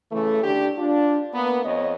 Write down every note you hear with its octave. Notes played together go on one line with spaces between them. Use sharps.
C#3 E3 A3
D3 D4 G4
D4 F4
A#3 B3
F2 C#5 D#5